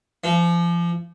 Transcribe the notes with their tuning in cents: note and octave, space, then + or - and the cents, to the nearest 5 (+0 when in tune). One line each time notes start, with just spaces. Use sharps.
F3 -30